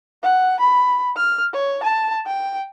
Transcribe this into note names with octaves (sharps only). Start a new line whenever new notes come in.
F#5
B5
F6
C#5
A5
G5